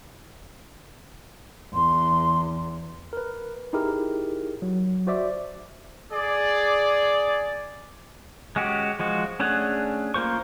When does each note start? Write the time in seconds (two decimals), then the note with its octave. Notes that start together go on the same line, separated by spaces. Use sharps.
1.74 E2 C6
3.13 A#4 B4
3.73 D#4 E4 G4 G#4 A#4
4.62 F#3
5.07 F#4 C5 D5 E5 D6
6.12 G#4 D5
8.56 G#3 C#4 F#4 G4
8.99 F3 G#3 F#4
9.40 A3 C#4 D4 G#4 F#5
10.14 A#3 F4 C5 C#6